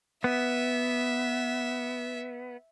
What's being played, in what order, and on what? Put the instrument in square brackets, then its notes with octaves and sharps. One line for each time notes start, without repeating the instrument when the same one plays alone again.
[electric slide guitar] B3 [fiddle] E5